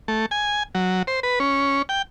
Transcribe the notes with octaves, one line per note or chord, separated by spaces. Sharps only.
A3
G#5
F#3
C5
B4
C#4
G5